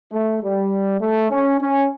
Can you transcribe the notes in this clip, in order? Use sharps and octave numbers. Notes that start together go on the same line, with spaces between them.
A3
G3
A3
C#4
C#4